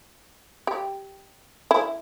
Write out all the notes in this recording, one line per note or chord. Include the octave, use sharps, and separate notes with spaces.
G4
E4